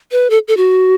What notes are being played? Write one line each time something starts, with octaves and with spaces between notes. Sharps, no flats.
B4
A4
A4
F#4